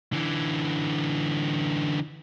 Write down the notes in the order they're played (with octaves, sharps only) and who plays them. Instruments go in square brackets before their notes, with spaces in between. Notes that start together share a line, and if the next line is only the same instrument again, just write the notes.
[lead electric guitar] D3 E3